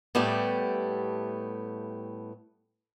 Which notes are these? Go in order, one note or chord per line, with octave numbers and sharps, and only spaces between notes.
A2 G3 A3 B3 G4